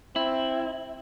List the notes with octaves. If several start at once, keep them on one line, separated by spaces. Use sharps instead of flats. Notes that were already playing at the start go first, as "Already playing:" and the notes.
C4 E4